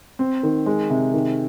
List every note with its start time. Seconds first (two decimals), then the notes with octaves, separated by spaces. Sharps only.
0.19 C4
0.43 D#3
0.66 G#3
0.90 C3
1.14 D#3